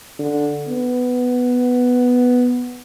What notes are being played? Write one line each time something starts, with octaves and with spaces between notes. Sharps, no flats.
D3
B3